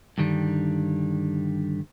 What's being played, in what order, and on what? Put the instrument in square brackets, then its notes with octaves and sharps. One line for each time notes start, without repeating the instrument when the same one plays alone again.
[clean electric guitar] G2 D3 D#3 G3